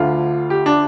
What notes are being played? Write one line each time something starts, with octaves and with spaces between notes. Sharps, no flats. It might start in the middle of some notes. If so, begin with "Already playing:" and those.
Already playing: D2 D3 F4
G4
D4